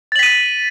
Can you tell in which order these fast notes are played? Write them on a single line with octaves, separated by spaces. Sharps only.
A6 F#7 B6 D#7